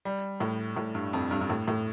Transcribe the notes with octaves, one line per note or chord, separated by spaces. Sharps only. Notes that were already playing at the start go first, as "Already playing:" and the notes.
G3
A2
A2
G2
F2
G2
G2
A2
A2